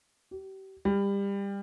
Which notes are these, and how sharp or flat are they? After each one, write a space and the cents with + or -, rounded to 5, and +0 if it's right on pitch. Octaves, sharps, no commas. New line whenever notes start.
G4 -35
G3 +25